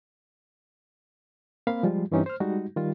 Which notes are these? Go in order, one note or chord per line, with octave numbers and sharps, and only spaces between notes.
A#3 C4 F5 B5
F3 G3 G#3 F4
G2 E3 C4 C#4 D#4 G4
C5 F6
G3 G#3 D#4 F#4
D#3 G3 F4